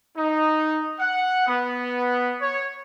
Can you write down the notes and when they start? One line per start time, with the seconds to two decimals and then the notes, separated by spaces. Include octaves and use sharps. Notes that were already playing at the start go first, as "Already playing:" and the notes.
0.16 D#4
0.99 F#5
1.47 B3
2.41 C#5